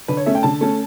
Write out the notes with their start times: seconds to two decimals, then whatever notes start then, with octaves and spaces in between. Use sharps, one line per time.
0.08 D3 B4
0.17 C#5
0.26 A3 C#4 E5
0.35 G5
0.43 D3 A5
0.61 A3 C#4